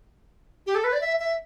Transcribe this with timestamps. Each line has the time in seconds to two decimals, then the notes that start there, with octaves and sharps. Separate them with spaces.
0.67 G4
0.75 A4
0.84 B4
0.93 D5
1.01 E5
1.19 E5